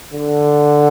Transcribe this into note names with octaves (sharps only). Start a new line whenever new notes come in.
D3